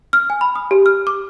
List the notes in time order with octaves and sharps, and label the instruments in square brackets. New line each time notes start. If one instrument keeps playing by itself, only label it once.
[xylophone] F6
G#5
B5
D#6
G4
F6
D6